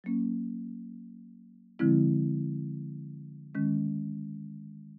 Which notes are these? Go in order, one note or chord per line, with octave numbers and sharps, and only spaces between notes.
F#3 A#3 C#4
D3 F3 G#3 C4 E4
D#3 G#3 C#4